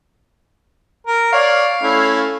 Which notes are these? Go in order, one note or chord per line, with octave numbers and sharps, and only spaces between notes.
A#4
C#5 D5 F5
A3 C#4 E4